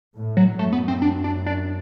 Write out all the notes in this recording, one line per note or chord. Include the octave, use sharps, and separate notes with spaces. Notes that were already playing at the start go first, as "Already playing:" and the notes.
A2
F#3
F#2 A3
B3
C4
D4
D4
D4